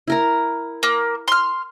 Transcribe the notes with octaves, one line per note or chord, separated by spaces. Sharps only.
E4 A#4 A#5
A#3
C6 F6